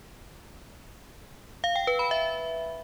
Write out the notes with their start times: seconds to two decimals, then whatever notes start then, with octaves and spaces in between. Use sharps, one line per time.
1.64 F5
1.76 G5
1.87 B4
1.99 B5
2.11 E5